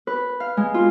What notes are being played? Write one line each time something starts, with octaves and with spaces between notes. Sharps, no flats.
B4
F5
G#3
F4